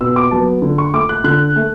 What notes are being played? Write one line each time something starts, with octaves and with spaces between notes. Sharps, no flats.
B2 E6
D6
F#3 B3 A5
D3
C#6
A3 D6
F#6
D3 F#6
A3